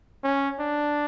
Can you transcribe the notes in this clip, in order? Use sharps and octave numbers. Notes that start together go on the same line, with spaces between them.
C#4
D4